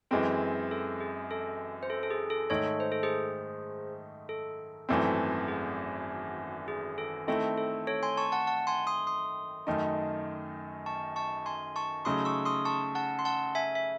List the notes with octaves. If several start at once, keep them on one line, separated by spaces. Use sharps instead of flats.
F#2 E3 G#3 C4 A4
A4
G#4
A4
C5
A4
A4
G#4
A4
G#2 D#3 A3 D#4 A4 C#5
C5
A4
G#4 C5
A4
G#1 F#2 E3 A3 C4
G#4
G#4
A4
D#3 A3 C4 E4 A4
A4
A4 C#5
G#5 C6
A5 C#6
F#5 A5
F#5 A5
G#5 C6
C6 D#6
C6 D#6
F#2 D#3 A3 D#4
A5 C#6
A5 C#6
G#5 C6
A5 C#6
C#3 F#3 A3 D#4 C6 D#6
C#6 E6
C6 D#6
A5 C#6
F#5 A5
C6
F#5 A5
E5 G#5
E5